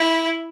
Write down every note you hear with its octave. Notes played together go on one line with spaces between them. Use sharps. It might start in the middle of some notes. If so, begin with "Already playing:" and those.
Already playing: E4